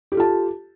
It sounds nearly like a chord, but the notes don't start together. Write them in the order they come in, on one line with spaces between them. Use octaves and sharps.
G4 A4 F4 A5